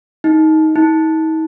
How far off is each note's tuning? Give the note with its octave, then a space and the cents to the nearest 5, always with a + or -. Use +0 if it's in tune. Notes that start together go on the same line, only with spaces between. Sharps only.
D#4 +20
D#4 +40